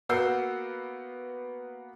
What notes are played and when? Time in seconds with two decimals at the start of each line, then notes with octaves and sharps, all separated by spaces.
0.09 A#3 B3 F#4 E6 G6 C7